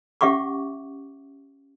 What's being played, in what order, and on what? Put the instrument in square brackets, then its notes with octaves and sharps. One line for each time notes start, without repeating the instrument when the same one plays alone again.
[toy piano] C#4 G4 E5 F#5 C#6 D6